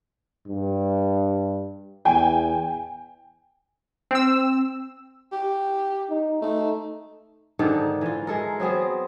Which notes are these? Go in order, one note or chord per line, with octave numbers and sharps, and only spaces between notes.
G2
E2 G5 G#5
C4 E6
G4
D#4
A3 D#4
G#2 D3 D#3 A4
E3 F4
G#3 A4 A#4
F#3 B3 C4 G#4